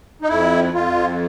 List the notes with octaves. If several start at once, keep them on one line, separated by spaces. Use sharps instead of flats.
D#4
F2 E4
F2 F4